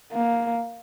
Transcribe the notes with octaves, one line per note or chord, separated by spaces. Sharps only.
A#3